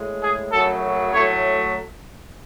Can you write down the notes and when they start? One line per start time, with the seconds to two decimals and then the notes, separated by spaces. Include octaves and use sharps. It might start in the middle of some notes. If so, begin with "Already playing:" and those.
Already playing: A2 G#3
0.23 G#4
0.52 F#2 C#3 F#3 A3 A4
1.13 A2 F#3 A3 C#5